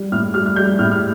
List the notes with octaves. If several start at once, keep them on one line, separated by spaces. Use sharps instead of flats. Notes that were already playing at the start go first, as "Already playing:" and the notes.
Already playing: G3
A2 F6
G3 F6
F6
G3 G6
A2 F6
F6